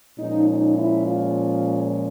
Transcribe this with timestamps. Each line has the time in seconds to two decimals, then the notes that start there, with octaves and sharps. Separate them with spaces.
0.19 A#2 F3 G#3 C#4 D#4
0.48 D#4
0.76 E4
1.07 F4